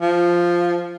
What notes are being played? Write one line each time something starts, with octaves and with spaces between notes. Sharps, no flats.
F3